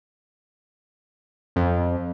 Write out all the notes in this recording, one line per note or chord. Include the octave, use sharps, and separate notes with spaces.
F2